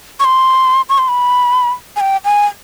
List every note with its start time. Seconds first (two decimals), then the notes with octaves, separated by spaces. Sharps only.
0.20 C#6
0.25 C6
0.89 C#6
0.98 C6
1.08 B5
1.96 G#5
2.01 G5
2.25 G#5